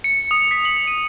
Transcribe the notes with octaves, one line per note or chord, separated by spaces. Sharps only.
C#7
D#6
B6
F#7
D#7